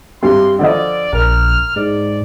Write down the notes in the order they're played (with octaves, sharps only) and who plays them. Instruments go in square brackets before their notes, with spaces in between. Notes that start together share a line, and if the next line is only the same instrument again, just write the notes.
[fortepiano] G2 C3 [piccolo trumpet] C6
[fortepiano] D3 F3 D#5 [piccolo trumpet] D5
[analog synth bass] A#1 [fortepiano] A#4 [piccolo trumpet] F6
[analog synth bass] G#2 [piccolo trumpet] D5